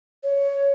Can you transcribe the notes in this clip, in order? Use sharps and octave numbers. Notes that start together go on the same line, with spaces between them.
C#5